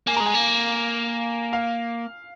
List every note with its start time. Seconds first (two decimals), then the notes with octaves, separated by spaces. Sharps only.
0.07 A#3 G#5
0.16 G#3 A#5
0.26 G#5
0.34 A#3
1.53 F5